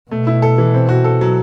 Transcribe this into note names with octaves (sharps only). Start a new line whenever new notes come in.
B2 A3
E4
A4
E3
C4
F#4
A4
F#3